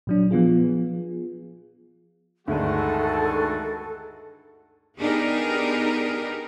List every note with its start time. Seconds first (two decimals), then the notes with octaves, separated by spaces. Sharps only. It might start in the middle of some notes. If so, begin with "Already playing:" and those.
0.07 A#2 F#3 D4
0.31 F3 B3 F4 G#4
2.48 D2 G2 D#3 G#3 F#4 A4
4.98 B3 D4 D#4 G4 G#4 A#4